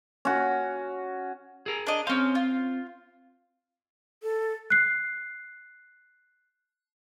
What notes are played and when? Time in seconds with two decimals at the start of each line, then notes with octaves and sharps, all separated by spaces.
0.25 C#4 F#4
1.66 G#4 A#4
1.87 D4 D#5
2.07 C4 C#4 C5 F5
2.35 F4
4.23 A4
4.70 F#6 C7